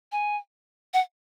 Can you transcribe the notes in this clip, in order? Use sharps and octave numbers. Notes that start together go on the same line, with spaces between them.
G#5
F#5